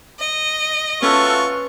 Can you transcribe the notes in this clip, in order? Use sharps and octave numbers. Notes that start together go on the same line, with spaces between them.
D#5
A3 C#4 F4 F#4 A4 B4 C#6